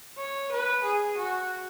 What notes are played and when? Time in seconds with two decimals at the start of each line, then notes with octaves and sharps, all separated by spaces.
0.17 C#5
0.52 B4
0.84 G#4
1.17 F#4